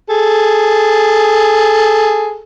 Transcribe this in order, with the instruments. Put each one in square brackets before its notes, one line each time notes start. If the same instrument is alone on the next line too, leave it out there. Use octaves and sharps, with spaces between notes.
[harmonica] G#4 A4